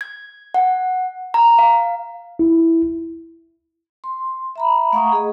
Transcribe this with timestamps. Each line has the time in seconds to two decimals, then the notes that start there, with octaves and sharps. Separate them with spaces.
0.01 G#6
0.54 F#5
1.34 A#5
1.58 F5
2.39 E4
4.04 C6
4.56 E5 A#5 B5
4.93 A3 F5 F#5 A#5 C#6 D#6
5.12 G#4 D#5